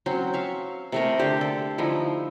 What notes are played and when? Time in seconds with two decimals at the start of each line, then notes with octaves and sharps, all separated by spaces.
0.06 F#3 C4 C#4 C5
0.34 E5 F5 C#6
0.92 C3 A3 A#4
1.19 D3 G4 C5
1.41 A4
1.78 D3 F3 D#4 E4